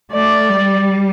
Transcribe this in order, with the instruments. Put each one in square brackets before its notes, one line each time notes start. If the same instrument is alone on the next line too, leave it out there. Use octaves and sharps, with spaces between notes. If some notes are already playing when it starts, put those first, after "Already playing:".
[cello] A3 [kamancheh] D5
[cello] G3